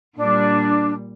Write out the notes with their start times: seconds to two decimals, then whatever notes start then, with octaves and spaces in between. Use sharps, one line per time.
0.17 A#2 G3 D4